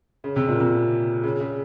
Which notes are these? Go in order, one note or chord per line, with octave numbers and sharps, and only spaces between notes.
C#3
C3
A#2
C3
C#3
C#3